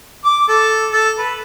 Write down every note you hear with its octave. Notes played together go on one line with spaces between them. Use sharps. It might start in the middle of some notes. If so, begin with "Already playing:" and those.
D6
A4
A4
B4